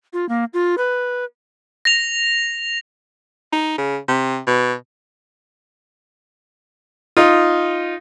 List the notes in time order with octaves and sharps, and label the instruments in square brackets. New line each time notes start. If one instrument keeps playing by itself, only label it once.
[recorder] F4
A#3
F4
B4
[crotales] A#6 F7
[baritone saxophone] D#4
C#3
C3
B2
[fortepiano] D#4 F4